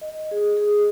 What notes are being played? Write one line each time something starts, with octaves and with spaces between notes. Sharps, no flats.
D#5
G#4
G#4